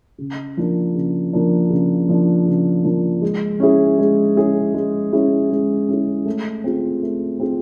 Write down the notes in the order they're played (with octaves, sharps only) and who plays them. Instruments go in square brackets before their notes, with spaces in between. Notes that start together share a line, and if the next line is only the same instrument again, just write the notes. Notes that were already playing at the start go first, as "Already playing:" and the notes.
[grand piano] C#3
F3 A#3 D4
C#3
F3 A#3 D4
C#3
F3 A#3 D4
C#3
F3 A#3 D4
G#3
C#4 E4 G#4
G#3
C#4 E4 G#4
G#3
C#4 E4 G#4
G#3
C#4 E4 G#4
A3
C4 F4 G#4
A3
C4 F4 G#4